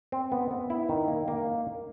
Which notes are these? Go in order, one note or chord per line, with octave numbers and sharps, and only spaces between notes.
C4
B3
B3
E4
D#3
A#3
A#3